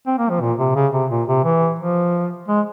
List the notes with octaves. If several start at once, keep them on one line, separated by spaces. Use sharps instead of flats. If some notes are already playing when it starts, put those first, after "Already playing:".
C4
A#3
F3
A#2
C3
C#3
C3
A#2
C3
E3
F3
G#3